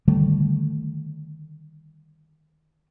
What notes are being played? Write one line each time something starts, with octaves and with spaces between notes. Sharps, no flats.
D3 D#3 G3 A3